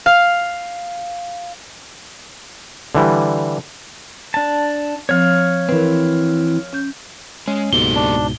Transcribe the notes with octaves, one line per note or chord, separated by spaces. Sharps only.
F5
D3 E3 G3
D4 A5
F3 C4 C#5 F5
E3 C4 A#4 B4
C#4 G6
G#3 C#4
C#2 G#2 B2 A#3 G4 A4 G7
D4